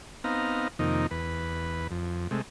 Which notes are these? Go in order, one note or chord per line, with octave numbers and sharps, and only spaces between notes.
B3 C4 D#4 F5 A#5
F2 C3 D#3 A#3 D#4
E2 B4
F2
C3 G#3 A3